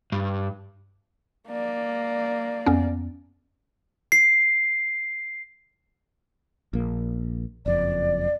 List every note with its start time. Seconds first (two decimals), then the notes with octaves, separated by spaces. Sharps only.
0.12 G2
1.48 A#3 D5
2.66 F2 B3 C#4
4.12 C7
6.73 A#1 A#3
7.66 F#1 F2 D5